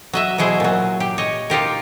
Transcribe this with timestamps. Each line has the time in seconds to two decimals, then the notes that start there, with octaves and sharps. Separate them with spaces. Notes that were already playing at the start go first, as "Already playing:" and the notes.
0.13 F#3 D#5 E5
0.38 B2 F#3 E4 G#4 C5
0.60 A#2 F#3
1.00 G4
1.18 C#5 D#5
1.50 D#4 F4 G4 A#4